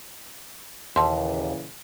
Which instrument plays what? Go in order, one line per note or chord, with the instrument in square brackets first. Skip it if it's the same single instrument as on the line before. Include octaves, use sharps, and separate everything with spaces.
[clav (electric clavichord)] D#2 [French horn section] A#2 C#3 E3 [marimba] A5 C6